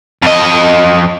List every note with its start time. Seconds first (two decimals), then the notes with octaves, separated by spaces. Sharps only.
0.23 F2 D#5